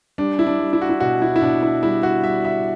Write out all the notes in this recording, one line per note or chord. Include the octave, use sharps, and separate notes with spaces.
G3 D4
E4
D4
G3
E4
F#4
E4
B2 F#4
E4
E4
B2 D4
E4
G3 E4
F#4
G3 E5
E5